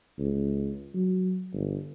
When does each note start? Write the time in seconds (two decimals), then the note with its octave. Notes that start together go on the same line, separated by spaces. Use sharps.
0.19 C#2
0.94 F#3
1.53 G1